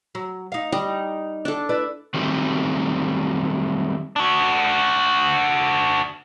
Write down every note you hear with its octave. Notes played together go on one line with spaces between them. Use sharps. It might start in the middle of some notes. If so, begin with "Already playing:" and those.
F#3
D#4 F5
G3 D#4
D4 A4
E4 B4 D5
D#3 F#3 G3 A3 C4 D#4
D4 F#4